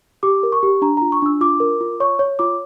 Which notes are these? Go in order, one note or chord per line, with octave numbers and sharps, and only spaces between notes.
G4 D6
A#4
C#6
G4
D4 A#5
F4 A#5
C#6
D4 E6
F4 D6
A#4
F4
C#5 C#6
C#5
F4 D6